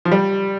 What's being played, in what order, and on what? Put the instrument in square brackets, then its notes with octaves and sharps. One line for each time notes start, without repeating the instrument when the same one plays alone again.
[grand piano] F3
G3